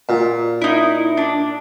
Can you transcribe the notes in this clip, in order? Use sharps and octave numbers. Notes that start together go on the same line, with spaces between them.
A#2
D#4 E4
D4